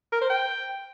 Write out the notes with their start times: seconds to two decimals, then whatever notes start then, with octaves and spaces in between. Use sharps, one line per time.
0.12 A#4
0.21 C5
0.30 G5